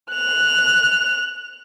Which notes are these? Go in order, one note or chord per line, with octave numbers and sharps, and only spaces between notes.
F#6 F7